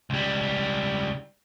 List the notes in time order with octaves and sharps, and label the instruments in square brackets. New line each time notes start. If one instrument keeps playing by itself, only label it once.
[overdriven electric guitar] C#2 G3